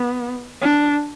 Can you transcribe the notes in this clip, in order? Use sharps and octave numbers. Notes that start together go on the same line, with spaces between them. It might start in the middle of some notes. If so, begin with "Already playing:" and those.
Already playing: B3
D4